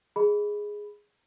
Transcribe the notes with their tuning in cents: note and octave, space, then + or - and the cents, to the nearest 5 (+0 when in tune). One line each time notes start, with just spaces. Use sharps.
G#4 +0 D#5 +10 B5 +0